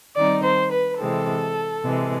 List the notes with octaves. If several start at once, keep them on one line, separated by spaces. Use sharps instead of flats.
D#3 G3 C4 D#4 D5
C5
B4
C3 E3 G#3 C4 A4
C3 E3 G#3